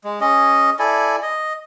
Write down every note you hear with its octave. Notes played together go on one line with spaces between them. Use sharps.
G#3
C#4 G#4 D#5
E4 A4 D5 G#5
D#5